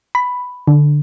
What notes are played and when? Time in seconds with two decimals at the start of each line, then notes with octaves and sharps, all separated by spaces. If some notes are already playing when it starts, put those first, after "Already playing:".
0.15 B5
0.67 D3